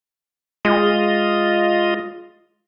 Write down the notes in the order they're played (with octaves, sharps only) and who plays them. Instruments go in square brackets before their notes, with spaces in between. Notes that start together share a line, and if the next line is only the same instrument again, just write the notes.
[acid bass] G#3 [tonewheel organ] F4 D#5